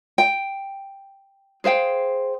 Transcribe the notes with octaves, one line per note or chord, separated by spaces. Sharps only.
G5
G#4 C5 F5 G5